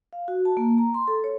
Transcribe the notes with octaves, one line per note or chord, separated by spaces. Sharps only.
F5
F#4
A5
A#3
A#5
C6
A4
C#5